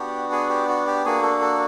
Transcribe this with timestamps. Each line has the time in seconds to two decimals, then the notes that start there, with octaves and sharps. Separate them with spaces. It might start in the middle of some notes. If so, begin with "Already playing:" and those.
Already playing: B3 D4 F#4 G4
0.32 G#4
0.50 G4
0.69 F#4
0.87 G4
1.05 A#3 D4 F#4 G#4
1.23 A4
1.41 A4